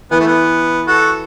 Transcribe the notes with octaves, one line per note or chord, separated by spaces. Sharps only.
E3 B3
A3
B3
F#4 A4